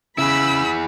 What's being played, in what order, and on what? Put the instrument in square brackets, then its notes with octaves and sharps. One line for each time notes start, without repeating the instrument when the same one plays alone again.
[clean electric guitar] C#3 [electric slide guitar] E4 G#4 [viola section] B5 [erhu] E6